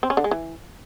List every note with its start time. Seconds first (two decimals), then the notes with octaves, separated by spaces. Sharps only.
0.03 C4
0.10 C#4
0.17 D3
0.24 G#3
0.31 E3